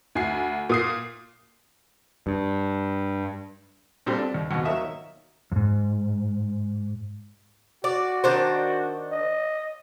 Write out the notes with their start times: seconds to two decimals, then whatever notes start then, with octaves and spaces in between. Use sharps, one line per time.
0.15 D2 G#5 C7
0.69 A#2 D#6 C7
2.27 G2
4.06 A#2 G3 C4 D4 G4 A4
4.18 D4
4.34 D#2
4.51 D#2 G#2 B2
4.65 F#3 A#3 D#4 E5 D#6
5.52 F2 G#2
7.84 F#4 D5
8.24 D#3 D4 C5
9.12 D#5